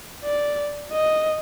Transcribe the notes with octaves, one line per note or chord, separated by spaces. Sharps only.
D5
D#5